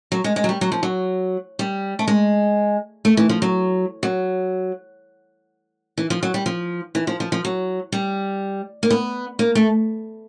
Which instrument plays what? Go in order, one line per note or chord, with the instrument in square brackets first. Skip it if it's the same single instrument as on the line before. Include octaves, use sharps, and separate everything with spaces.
[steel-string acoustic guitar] F#3
G#3
G#3
F#3
G3
F#3
F3
F#3
G3
A3
G#3
A3
E3
F3
F#3
F#3
E3
F3
F#3
G3
F3
E3
F3
F3
F3
F#3
G3
A#3
B3
A#3
A3